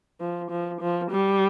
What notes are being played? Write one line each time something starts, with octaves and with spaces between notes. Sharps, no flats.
F3
F3
F3
G3